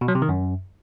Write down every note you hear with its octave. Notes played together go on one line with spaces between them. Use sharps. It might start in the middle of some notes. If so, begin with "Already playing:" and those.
B2
F#3
C3
D#3
F#2